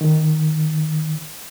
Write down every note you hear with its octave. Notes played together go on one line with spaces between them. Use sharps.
D#3